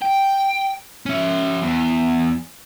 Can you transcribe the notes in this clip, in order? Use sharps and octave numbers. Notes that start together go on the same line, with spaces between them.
G5
C#4 E5
E2